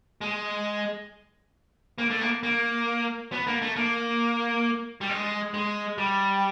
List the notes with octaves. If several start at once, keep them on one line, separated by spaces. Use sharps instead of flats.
G#3
A#3
A3
A#3
A#3
B3
A#3
A3
A#3
G3
G#3
G#3
G3